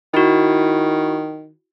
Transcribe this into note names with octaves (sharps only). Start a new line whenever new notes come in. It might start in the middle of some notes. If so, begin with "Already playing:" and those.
D#3 E4 F#4